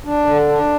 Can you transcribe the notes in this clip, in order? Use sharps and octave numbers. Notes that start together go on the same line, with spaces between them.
D4
D3
D4